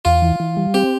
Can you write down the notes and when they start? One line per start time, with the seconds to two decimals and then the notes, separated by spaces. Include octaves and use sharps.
0.05 E2 F4
0.22 E3
0.40 E3
0.57 G3
0.74 C4 G4